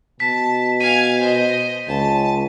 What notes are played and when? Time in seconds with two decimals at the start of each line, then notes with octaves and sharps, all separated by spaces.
0.20 B2 A5 B6
0.81 F5 G#5 D#7
1.20 C5 D#5
1.88 C#2 A5